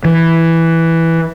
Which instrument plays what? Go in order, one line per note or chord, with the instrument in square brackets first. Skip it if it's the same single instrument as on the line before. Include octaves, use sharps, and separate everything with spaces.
[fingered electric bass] E3